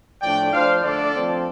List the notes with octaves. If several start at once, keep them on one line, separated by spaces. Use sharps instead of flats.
A2 F3 A3 D4 D5 G5
F3 D4 C5 F5
D3 A3 D4 A4 D5
F3 C4